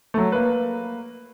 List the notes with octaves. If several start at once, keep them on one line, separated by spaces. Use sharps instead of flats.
F#3 A3
A#3 B4